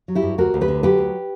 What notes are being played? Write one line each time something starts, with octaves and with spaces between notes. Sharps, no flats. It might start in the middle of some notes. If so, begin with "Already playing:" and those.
F#3
E4 G4
G2
D2 F#4 A#4
D2
G4 B4
D3
F#3 G4 B4
D2